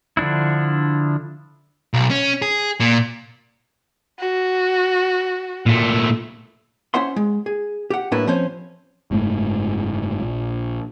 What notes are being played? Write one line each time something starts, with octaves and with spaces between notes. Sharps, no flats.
D3 F3 D4 E4
B1
C#4
G#4
A#2
F#4
A#2 A3
C#4 E4 C5 E5 F#5 C6
G#3
G#4
G4 F#5
A2 G3 A#3 D4 E4 B4
F3 C4 C#4 C5 C#5
F#1 G#2 A3
A#1